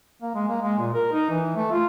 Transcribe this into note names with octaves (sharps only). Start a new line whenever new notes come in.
A#3
G#3
A#3
G#3
A#2
A#4
D#4
E3
A3
F4